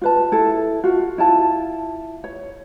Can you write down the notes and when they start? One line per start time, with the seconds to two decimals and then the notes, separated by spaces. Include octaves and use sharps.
0.01 F4 B4 A5
0.32 E4 A4
0.84 F4 F#4
1.18 E4 F4 A5
2.24 C#5